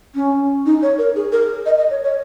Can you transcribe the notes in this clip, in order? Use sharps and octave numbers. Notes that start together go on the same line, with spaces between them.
C#4
D#4
C#5
A#4
G#4
A#4
D#5
D#5
C#5
C#5